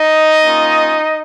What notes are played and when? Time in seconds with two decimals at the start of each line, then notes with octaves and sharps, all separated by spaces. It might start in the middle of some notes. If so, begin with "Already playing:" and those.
Already playing: D#4 D#5
0.44 A#3 C#4 F4